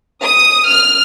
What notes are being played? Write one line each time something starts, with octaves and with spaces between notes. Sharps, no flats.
D#6
F6